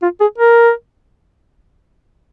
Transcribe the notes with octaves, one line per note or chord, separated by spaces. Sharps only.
F4
G#4
A#4